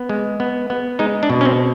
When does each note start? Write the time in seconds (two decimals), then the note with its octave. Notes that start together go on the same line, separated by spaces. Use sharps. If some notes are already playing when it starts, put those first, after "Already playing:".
Already playing: B3
0.09 G#3
0.40 B3
0.70 B3
0.99 G#3 D#4
1.23 D4
1.30 B2
1.41 C#4
1.45 C4